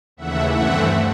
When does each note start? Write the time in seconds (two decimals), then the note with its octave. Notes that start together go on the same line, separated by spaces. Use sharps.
0.17 D#2 C#3 E3 A3 E5 F#5
0.52 G2 E3 A3 C4 E5 F#5